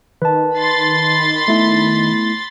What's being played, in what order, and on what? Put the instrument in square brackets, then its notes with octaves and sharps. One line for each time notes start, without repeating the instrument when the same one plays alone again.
[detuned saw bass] D#3 [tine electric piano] B4 A5
[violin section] B5 C6 A6
[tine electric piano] A3 B3 E4